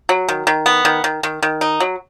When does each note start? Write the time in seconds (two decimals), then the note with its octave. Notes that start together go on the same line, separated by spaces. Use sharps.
0.09 F#3
0.29 D#3
0.47 D#3
0.66 B3
0.85 D#3
1.04 D#3
1.23 D#3
1.43 D#3
1.61 D#4
1.80 F#3